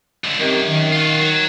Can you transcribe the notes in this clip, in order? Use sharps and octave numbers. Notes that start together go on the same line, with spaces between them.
C#2 D3
F#2 D#3 C4 G4
D#3
F4 F#4
F#3